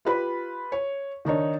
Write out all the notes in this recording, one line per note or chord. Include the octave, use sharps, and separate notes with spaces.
F4 G4 B4 B5
C#5
D#3 D4 D#4 C#5